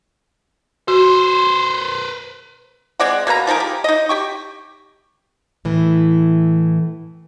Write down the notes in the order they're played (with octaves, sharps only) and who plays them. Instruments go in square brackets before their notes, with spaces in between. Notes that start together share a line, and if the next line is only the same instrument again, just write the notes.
[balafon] F#4 [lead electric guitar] B4 C5
[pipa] G#3 C4 D5 F#5
B2 A#3 B4 A#5
F3 D#4 G#4 A#4
G4
D#4 D#5
G4 G5 C#6
[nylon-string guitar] A2 E3